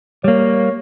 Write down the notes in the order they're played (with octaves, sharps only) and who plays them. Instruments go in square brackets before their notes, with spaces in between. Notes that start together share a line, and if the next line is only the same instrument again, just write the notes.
[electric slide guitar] G3 A#3 [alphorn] C#5